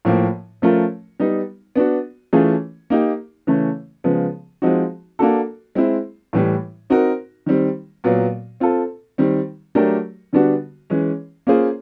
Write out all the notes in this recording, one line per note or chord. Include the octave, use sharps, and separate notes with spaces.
A2 F3 A#3
F3 A3 C#4 F4 A#4
G3 B3 D#4
B3 D4 F#4
E3 A3 C#4 F4 G#4
A#3 D#4 G4
C#3 E3 A3 C#4
C#3 F3 G#3 B3
F3 G#3 C4 D#4 F#4
A#3 D4 F#4 A4
G#3 C4 E4
A2 E3 G3
C4 D#4 F#4 A#4
D#3 G3 C4
A#2 F#3 B3
C4 F4 A4
D#3 G3 C4
F#3 A3 D4 G4 A#4
D3 G3 B3 D4 F#4
E3 G#3 C#4
A#3 C#4 F4 G#4 C5